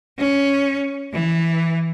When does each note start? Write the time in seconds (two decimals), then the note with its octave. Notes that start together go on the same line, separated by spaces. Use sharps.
0.18 C#4
1.13 E3